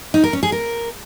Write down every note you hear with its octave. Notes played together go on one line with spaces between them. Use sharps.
D#4
A#4
C#4
G#4
A#4